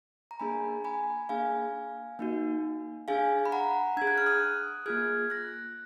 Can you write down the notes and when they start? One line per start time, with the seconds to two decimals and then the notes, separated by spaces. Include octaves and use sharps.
0.31 A#5
0.40 A#3 D4 G#4 G#5 B5
0.84 G#5 B5
1.29 A#3 D4 G#4 F5 G#5
2.19 A#3 D#4 F#4
3.08 D4 G#4 F5 G#5
3.45 B5
3.52 F#5 A#5
3.97 D4 G#4 G#6
4.07 F#6
4.18 F6
4.26 D#6 F#6
4.86 A#3 F4 G#4 F6 G#6
5.30 F#6 A#6